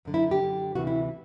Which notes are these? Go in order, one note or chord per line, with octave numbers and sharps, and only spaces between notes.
F#2 D3
E4
G4
F#2 D3
D2 C3 E3 F#4
E4